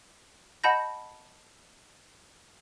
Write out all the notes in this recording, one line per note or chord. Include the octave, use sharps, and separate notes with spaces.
D#5 F#5 A5 B5 G6 A#6